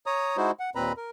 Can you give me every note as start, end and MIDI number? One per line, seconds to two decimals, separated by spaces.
0.06 0.37 73
0.06 0.37 82
0.06 0.37 87
0.37 0.51 56
0.37 0.51 63
0.37 0.51 64
0.37 0.51 66
0.37 0.51 72
0.59 0.70 78
0.75 0.93 39
0.75 0.93 46
0.75 0.93 60
0.75 0.93 71
0.75 0.93 82
0.75 0.93 83
0.97 1.10 70